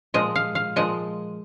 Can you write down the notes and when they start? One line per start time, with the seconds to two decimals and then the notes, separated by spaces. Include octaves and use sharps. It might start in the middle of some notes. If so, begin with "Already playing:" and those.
0.14 A#2 F3 G#3 D#5
0.35 F5
0.55 F5
0.76 A#2 F3 G#3 D#5